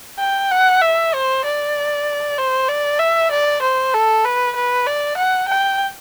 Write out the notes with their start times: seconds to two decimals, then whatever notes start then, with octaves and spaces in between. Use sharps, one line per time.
0.19 G5
0.51 F#5
0.81 E5
1.14 C5
1.45 D5
2.38 C5
2.68 D5
2.99 E5
3.31 D5
3.62 C5
3.94 A4
4.25 B4
4.56 B4
4.87 D5
5.17 F#5
5.48 G5